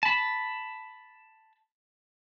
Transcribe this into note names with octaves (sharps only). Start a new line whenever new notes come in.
A5 B5